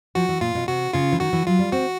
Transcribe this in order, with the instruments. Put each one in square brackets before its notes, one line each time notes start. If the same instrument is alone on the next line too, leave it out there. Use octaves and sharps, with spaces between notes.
[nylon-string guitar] F3 [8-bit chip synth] F#4
[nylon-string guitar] E3
[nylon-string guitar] A#2 [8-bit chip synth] F4
[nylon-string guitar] B2
[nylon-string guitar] C3 [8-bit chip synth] F#4
[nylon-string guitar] C#3 [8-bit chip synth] F4
[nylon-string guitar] E3
[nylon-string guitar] D#3 [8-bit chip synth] F#4
[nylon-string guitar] E3
[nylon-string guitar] F#3 [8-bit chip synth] F4
[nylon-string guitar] G3
[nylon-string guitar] C4 [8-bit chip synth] F#4